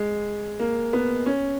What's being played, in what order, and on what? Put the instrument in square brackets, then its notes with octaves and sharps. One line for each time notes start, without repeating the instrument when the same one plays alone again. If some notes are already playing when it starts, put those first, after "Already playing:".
Already playing: [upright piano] G#3
A#3
B3
C#4